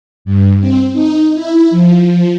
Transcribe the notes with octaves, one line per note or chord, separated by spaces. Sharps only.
G2
C4
D#4
E4
F3